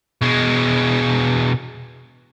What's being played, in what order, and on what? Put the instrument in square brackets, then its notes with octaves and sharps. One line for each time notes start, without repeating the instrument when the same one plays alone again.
[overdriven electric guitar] B2 G#3